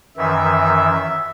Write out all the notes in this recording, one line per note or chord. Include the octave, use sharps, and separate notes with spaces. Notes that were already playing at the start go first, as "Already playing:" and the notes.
F#2 D#3 E3 E5